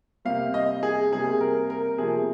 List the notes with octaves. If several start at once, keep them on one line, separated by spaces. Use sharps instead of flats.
C3 G3 A#3 F5
D#5
G#4
C3 G3 A#3 G#4
A#4
A#4
C3 F3 A#3 G#4